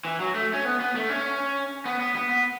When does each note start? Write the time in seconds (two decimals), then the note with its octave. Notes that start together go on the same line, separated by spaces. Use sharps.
0.05 E3
0.20 F#3
0.35 A3
0.53 C#4
0.65 B3
0.80 B3
0.95 A3
1.09 C#4
1.85 B3
2.00 B3
2.15 B3
2.30 B3